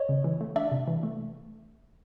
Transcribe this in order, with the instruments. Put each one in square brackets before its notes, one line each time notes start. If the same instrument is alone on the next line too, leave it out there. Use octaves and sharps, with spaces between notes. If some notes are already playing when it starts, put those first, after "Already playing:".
Already playing: [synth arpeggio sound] C#5 D#5
C#3
E3
A3
D4 D5 E5
C3
E3
A3